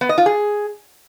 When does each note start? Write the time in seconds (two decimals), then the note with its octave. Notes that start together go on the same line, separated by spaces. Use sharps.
0.01 B3
0.09 D#5
0.18 F4
0.26 G#4